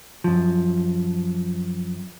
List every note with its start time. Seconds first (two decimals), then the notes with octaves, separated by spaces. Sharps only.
0.24 F#2 F3